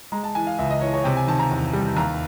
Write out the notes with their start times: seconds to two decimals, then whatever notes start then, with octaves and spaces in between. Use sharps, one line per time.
0.12 G#3 A#5
0.24 A5
0.35 E3 G#5
0.47 F5
0.58 C#2 E5
0.70 D#5
0.81 E3 C#5
0.94 C#5
1.04 C3 G5
1.17 G#5
1.27 D#3 A5
1.39 A#5
1.51 E2
1.73 G3
1.96 D#2 A#5